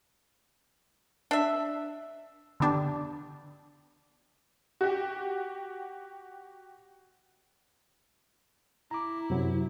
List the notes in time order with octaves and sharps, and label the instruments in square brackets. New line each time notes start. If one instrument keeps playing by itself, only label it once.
[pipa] D4 E5
[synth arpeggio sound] D3 B3 D4 G4
[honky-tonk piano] F#4 G4
[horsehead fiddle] E4 [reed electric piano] A#5 D6
[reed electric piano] F#2 C3 F#3